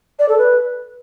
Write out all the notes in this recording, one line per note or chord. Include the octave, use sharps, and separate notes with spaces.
D5
A4
B4